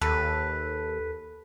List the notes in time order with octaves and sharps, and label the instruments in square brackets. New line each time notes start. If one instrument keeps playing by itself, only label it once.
[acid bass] D#2 [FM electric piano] A4 [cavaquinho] B4